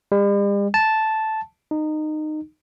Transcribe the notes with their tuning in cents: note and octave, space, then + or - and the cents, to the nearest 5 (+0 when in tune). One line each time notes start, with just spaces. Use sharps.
G3 +45
A5 -5
D#4 -20